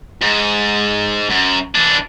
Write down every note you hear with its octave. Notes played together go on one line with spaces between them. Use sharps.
G#2
F#2
E3 D4